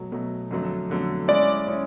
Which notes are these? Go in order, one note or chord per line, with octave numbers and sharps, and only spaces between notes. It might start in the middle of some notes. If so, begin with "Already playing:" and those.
Already playing: B2 F#3 A3
B2 F#3 A3
F2 D3 F#3 A3
F2 D3 F#3 A3
G#3 C#4 E4 D5
G#3 C#4 E4